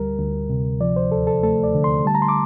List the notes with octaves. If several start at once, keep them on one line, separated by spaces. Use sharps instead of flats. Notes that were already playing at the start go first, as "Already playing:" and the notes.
Already playing: D2 G3 A#4
D2
C3
F3 D5
C5
D#2 A4
A4
A3 A4
D5
D3
C6
G3 A5
A#5
C6
D6